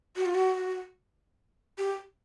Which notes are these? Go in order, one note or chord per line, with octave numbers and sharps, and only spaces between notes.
F#4
F4
F#4
G4